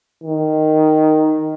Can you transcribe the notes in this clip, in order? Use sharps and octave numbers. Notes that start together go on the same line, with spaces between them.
D#3